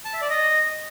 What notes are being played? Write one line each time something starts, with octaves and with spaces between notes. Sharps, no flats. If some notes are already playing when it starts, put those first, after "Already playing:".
A5
E5
D5
D#5